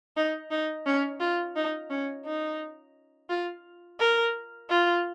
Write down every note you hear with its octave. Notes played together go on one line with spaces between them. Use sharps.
D#4
D#4
C#4
F4
D#4
C#4
D#4
F4
A#4
F4